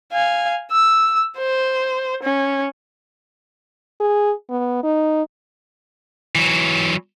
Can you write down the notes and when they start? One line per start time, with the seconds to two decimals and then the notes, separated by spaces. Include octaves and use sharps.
0.12 F5 G#5
0.71 E6
1.38 C5
2.23 C#4
4.00 G#4
4.50 B3
4.83 D#4
6.35 E3 F#3